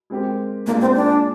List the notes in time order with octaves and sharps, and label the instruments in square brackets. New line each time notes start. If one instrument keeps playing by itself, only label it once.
[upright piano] G#3 C4 G4 A#4
[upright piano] A#2 G#3 D4 G#4 [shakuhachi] A#3
[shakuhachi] C4
D4